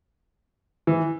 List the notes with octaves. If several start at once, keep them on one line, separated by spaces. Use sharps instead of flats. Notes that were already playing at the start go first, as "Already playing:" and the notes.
E3